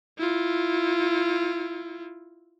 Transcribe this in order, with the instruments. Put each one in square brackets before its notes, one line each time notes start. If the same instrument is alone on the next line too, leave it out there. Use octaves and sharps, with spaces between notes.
[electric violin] E4 F4